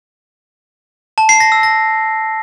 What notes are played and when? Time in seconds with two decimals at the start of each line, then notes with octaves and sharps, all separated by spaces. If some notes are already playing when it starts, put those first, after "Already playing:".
1.18 A5
1.29 C7
1.40 A#6
1.52 E6
1.63 A#6